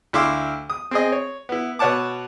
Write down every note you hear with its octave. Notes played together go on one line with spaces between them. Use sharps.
D2 E4 F5 C6 D6 E6
D#6
C4 G#4 D#5
C#5
B3 E4
B2 B4 C#5 F#5 A5 D6